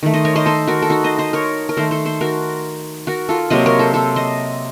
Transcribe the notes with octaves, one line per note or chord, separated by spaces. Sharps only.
D#3 A3
C5 D#5
A#4 C#5
C5 D#5
A4 C5
F#4 A#4
A4
D#4 F#4
C5 D#5
C5 D#5
A#4 C#5
A#4
D#3 A3 A4 C5
A4 C5
A4 C5
F#4 A#4
F#4 A#4
F4 A4
C3 F#3 A#3 C5 D#5
A#4 C#5
A4 C5
A4 C5
C5 D#5